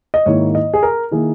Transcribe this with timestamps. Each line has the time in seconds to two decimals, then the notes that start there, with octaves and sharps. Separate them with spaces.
0.14 D#5
0.26 G#2 D#3 A#3 E4 C#5
0.55 D#5
0.74 G#4
0.83 A#4
1.11 D#3 A#3 E4 G#4